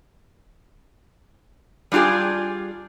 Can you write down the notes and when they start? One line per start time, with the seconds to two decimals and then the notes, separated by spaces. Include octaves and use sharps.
1.92 G3 D4 F4 G4 G#4